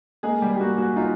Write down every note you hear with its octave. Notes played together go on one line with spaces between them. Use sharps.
G#3 A#3 G#4
G3 G4
G4
A#3 F#4
F#4
D#4 F4